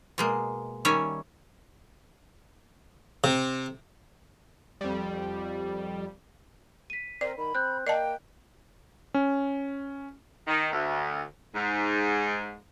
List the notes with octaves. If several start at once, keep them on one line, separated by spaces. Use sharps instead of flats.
B2 G#3 A#3
D#3 G3 C#4 C#5 E5 G#5
C3
F2 G3
B6 D#7
C4 A#4 D5
D#3 B5
C4 F#6 G6
A#3 D5 D#5 G5 A5
C#4
D#3
D2
G#2